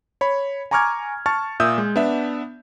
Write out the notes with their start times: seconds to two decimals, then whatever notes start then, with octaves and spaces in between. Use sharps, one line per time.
0.21 C#5 B5
0.71 G#5 A#5 C#6 D6 F6 G#6
1.26 A5 C#6 F6 A6
1.60 A#2 E5 D#6 E6 G6
1.78 G#3
1.96 B3 D4 E5